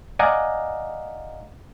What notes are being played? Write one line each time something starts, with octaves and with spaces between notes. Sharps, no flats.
D5 D#5 F5 F#5 G#5 A#5